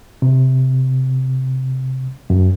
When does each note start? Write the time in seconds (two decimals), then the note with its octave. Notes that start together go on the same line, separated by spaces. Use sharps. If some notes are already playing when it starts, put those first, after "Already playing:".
0.22 C3
2.30 F#2